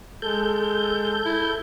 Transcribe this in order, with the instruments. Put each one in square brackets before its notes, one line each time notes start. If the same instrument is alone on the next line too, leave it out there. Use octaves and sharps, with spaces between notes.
[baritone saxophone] G#3 [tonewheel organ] A4 G6
[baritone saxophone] E4